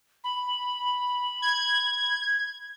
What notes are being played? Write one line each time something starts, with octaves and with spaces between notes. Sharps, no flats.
B5
G#6